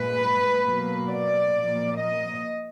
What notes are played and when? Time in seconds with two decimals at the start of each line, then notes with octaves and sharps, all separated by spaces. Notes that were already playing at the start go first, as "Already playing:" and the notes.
Already playing: A#2 G#3 B4
0.63 B2 F#3 A#3
1.09 D5
1.54 A#2 F3 A#3
1.99 D#5